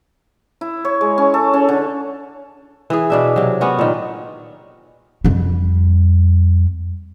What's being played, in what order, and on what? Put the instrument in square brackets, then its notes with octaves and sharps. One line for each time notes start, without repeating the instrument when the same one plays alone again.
[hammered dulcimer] E4
C#5
G#3
C#4
A4
C#4
D3
[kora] E3 G#4
B2 D4 E5
C3 F#3
B3 C#4 F#4
A#2 D#3
[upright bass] F2 G3